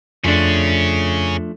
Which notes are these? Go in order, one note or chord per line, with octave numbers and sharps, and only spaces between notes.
F2 F3 A3 C#4 D4 G#4